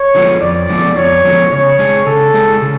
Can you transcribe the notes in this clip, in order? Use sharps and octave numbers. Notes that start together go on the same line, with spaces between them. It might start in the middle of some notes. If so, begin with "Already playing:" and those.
Already playing: C#5
D3 F3 G#3 B3
F2 D5
D3 F3 G#3 B3
F2 C#5
D3 F3 G#3 B3
C#3 C#5
G#3 D4 G#4
C#3 A4
G#3 D4 G#4
C#3